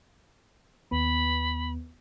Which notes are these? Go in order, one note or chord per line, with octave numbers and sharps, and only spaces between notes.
D#2 B3 B5